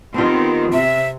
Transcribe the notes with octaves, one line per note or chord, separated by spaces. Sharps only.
D#3 B3 C4 F4 G4 A5
C3 E5